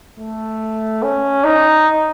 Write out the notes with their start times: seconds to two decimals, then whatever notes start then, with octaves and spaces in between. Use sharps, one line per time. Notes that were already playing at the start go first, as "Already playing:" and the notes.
0.18 A3
1.03 C#4
1.44 D#4